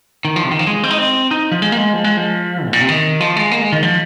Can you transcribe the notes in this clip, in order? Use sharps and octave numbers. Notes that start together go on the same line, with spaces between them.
D#3
F3
C3
D#3
F3
G#3
C4
D#4
C4
D#4
F3
G#3
A#3
G#3
F3
G#3
F3
G#2
A#2
C3
D#3
F3
G#3
A#3
G#3
D#3
F3